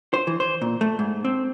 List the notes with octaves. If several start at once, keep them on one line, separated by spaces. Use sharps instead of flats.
C5
E3
C5
A#2
A3
G#2
C4